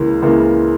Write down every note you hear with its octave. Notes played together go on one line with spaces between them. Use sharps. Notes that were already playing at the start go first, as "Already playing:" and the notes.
Already playing: C#2 C#3 E3 A#3
C#2 C#3 E3 A#3